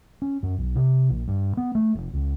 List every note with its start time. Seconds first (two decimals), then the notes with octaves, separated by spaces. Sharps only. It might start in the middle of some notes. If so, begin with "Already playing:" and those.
0.22 C#4
0.43 F#2
0.58 B1
0.76 C3
1.10 A#1
1.28 G2
1.57 B3
1.75 A3
1.95 F1
2.13 C#2